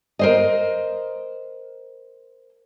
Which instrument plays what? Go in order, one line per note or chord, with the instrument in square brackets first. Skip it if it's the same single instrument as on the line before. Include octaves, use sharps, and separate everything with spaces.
[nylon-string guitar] A#4 C5 D#5